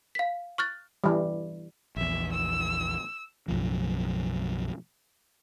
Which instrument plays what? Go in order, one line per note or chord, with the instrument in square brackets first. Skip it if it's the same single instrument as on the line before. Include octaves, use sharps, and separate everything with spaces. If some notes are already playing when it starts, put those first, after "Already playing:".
[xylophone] F5 B6
C#6 F6 F#6 A6
[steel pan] E3 G3
[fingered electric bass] A#1 E2 [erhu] E5
[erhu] E6
[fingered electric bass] B1 F#2 A2 F3